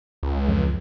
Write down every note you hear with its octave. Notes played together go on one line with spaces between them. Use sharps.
C#2
F2